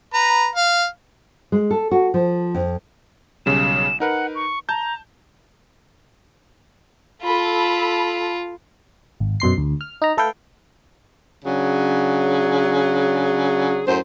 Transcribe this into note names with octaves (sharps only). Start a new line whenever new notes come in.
B4 A#5
F5
G#3
A4
F#4
F3
F2
B1 C#3 G3 E7
D#4 A#4 B4 F#5
C#6
A5 A#5 G6
F4 A4 B5
G#1
F#2 B2 C6 C7
D2
F6
D#4 A#5
A3 A4 B4 F5 G5
C#3 F#3 D4 G#4
F#2 A2 C5